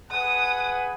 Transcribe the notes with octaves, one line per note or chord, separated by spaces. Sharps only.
G#4 B4 F#5 D#6